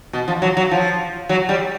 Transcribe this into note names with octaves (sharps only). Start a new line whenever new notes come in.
B2
F3
F#3
F#3
F3
F#3
G3